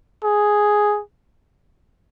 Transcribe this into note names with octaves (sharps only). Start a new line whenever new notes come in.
G#4